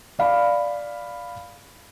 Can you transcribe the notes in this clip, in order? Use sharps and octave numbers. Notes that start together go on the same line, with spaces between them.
D5 F5 B5